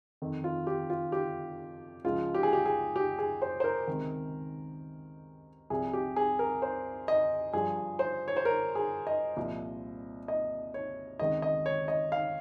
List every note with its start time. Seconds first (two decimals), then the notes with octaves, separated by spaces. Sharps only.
0.22 F2 D#3
0.44 F4
0.67 G4
0.90 F4
1.12 G4
2.05 C#2 C#3 F3 F4
2.34 G4
2.43 G#4
2.53 G4
2.66 G#4
2.96 G4
3.19 G#4
3.42 C5
3.60 C5
3.64 A#4
3.87 C#2 C3 D#3
5.70 C2 C3 F3 G#4
5.93 G4
6.16 G#4
6.39 A#4
6.62 C5
7.08 D#5
7.53 G2 F3 G#4
7.99 C5
8.28 C#5
8.37 C5
8.45 A#4
8.75 G#4
9.07 D#5
9.37 C2 A#2 F3
10.28 D#5
10.74 C#5
11.19 C#2 C3 D#3 D#5
11.42 D#5
11.66 C#5
11.88 D#5
12.12 F5